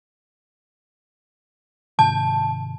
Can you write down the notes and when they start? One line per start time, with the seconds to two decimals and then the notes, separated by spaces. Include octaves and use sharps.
1.99 G#2 C3 D#3 A5